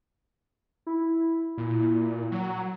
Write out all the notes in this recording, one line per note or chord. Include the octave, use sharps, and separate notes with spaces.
E4
A#2
F#3